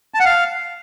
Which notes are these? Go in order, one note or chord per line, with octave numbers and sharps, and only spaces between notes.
A5
F#5
F5